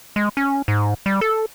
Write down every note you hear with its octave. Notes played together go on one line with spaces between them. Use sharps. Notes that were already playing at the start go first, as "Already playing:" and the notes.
G#3
C#4
G#2
G3
A4